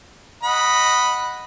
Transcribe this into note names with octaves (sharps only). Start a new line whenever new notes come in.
D#5 F#5 B5